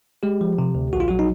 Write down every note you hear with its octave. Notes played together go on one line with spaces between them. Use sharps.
G#3 G4
F3
C3
D2
A#1 F#4
F4
F#3 F#4
D#4